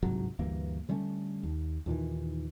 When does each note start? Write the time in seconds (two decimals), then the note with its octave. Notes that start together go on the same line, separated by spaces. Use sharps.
0.02 G1 C2 G#2 F#3
0.39 D2 G2 E3 A#3
0.89 D3 G3 A3 C#4
1.43 D#2
1.86 D#2 A#2 D#3 E3